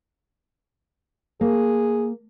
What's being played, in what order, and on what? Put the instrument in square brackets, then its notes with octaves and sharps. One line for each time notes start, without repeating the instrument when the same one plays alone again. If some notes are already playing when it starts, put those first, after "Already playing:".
[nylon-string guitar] A#3 [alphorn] G#4